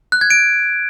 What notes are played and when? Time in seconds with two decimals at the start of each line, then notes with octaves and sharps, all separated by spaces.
0.12 F#6
0.21 G#6
0.30 D7